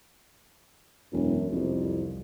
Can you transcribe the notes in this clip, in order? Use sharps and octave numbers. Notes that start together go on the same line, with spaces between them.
E1 F#2
C2 F2